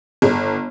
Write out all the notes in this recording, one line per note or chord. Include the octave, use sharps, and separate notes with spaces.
G1